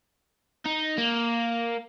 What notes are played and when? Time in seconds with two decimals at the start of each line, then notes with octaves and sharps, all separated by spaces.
0.66 D#4
0.98 A#3